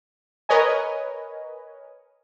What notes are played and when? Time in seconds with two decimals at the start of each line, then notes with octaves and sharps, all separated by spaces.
0.49 A#4 B4 C#5 D#5 G#5